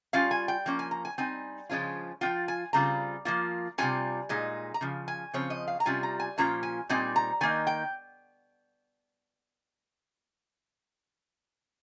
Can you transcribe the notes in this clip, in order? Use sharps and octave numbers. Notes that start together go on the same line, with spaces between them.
G3 C#4 F4 F5
G#5
G5
F3 A#3 C#4
G#5
A#5
G#5
G3 C4 D#4 G#5
C#3 F3 G#3 C#4 F4
F3 C4 F4 G5
G#5
C#3 G3 C4 F4 A#5
F3 A#3 F4
C3 G3 C#4 F4 G#5
A#2 G#3 D#4
A#5
C#3 F3
G#5
C#3 F3 C4 C#5
D#5
F5
A#5
C3 G3 C#4 F4 G#5
A#5
G#5
A#2 F3 A#3 C#4 F4 A#5
G#5
A#2 G3 C4 D#4 G#5
A#5
D#3 A#3 D#4 G#5
G5